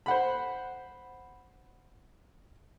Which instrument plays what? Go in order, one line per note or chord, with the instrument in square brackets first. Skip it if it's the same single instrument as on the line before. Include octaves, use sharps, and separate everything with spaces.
[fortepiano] C5 F#5 B5